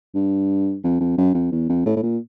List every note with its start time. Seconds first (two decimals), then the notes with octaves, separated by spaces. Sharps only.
0.15 G2
0.84 F2
1.00 F2
1.17 F#2
1.34 F2
1.52 E2
1.69 F2
1.86 A2
1.96 A2
2.02 A#2